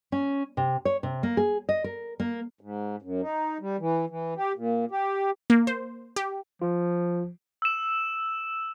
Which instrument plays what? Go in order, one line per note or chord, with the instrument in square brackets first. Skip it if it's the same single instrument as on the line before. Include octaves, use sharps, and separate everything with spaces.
[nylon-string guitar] C#4
C3
C#5
C3
A#3
G#4
D#5
A#4
A#3
[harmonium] G#2
F#2
D#4
G3
E3
E3
G4
A#2
G4
[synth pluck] A#3
C5
G4
[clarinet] F3 [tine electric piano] F4
[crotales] E6 E7